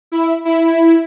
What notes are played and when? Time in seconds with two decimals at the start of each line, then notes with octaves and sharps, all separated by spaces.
0.12 E4
0.45 E4